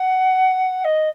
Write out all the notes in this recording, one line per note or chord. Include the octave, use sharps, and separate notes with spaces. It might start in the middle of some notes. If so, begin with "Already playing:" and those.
Already playing: F#5
D#5